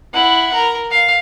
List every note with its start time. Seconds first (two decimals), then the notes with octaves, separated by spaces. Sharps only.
0.14 E4 F#5
0.53 A#4
0.91 F5